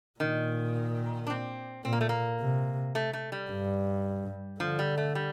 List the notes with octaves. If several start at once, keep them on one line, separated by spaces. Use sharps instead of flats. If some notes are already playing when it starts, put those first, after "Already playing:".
A#2 D#3
D4
C4
A#2 C4
A#3
A3
A#3
C3
A3
A3
G3
G2
D3 F3
G3
A3
G3